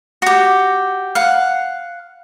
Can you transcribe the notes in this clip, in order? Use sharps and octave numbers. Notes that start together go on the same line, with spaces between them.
F#4 G4
F5 F#5